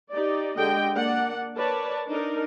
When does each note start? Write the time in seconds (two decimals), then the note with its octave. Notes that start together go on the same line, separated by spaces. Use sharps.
0.11 D#4 G4 D5
0.58 D3 G#3 G4 D#5 G5
0.95 A#3 D4 D5 F#5
1.57 A#4 B4 C#5 D5 A5
2.08 D4 D#4 A#4